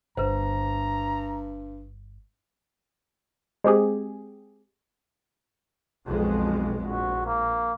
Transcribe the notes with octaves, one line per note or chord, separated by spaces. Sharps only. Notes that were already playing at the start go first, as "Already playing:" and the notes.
G1 G2 B4 C5 A#5
G#3 C4 G4 G#4
B1 F2 G#3
A#1 F#4
A#3